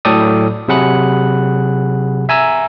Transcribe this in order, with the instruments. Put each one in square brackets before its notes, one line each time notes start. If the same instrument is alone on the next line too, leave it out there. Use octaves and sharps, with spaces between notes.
[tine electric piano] A2 F#3 A4 D5 G5 D#6
C3 F#3 G#4 F#5 B5 F#6
E5 G#5 A#5 E6